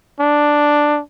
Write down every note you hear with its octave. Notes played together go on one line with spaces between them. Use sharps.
D4